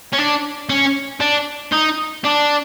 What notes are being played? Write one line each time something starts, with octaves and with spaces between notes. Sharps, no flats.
C#4
D4
C#4
D4
D#4
D4